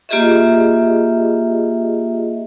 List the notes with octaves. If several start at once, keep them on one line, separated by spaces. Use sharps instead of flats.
A#3 F4 G4 G#4 D#5 E5